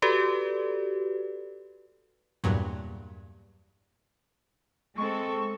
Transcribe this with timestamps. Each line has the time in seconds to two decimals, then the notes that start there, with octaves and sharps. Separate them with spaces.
0.02 F#4 G4 A4 B4 D5
2.44 E2 G2 A#2 F#3
4.98 G#3 C4 A4 C#6